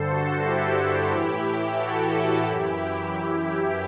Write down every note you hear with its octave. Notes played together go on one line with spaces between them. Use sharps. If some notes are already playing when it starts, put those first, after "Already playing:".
Already playing: G2 D3 A4 C5
F#4 A4
E4 G4
E4 G4
A2 E3 E4 G4
E4 G4
F#4 A4
F#2 E3 E4 G4
E4 G4